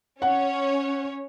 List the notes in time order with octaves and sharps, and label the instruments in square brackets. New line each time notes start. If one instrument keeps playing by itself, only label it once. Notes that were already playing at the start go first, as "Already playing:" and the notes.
[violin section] C#4 C#5 [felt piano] F#5